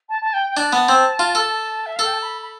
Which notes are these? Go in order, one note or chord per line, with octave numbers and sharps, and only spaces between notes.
A5
A5
G5
G5
D4 A5
B3
C4
F4
A4
E5
A4 F5
G5
A5
B5
B5